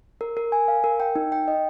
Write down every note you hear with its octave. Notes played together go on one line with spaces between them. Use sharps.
A#4
A#4
G#5
F5
A#4
G5
D#4
G5
D#5